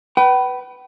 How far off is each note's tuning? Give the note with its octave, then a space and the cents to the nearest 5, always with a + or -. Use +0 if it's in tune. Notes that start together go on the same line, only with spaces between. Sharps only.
B4 +0 G5 -45